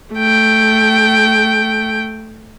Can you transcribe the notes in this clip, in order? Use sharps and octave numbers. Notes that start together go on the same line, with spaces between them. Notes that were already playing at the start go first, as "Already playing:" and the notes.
A3 G5